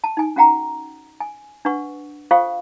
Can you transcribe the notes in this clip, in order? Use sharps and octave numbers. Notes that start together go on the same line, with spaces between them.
A5
D#4 G#5
C#4 F#4 F#5 G5 A#5
G#5
D4 B4 F#5 C#6
F4 A4 C5 F5 G5 C#6